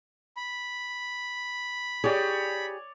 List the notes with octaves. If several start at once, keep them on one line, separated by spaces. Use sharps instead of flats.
B5
G4 G#4 C#5 D5